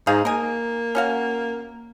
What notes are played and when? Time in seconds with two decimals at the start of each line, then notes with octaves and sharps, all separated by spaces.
0.07 G#2 D#4 G#4 F5
0.25 A#3 A#4 D#5 G#5
0.95 C#4 F#4 F5